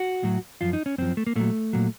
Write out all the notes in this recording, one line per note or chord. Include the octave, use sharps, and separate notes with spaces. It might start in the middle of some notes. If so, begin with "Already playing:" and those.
Already playing: F#4
A2 F#3
F#2 F3 F4
D#4
C#4
F#2 F3 C4
A3
A#3
A#2 F#3 A3
A#2 F#3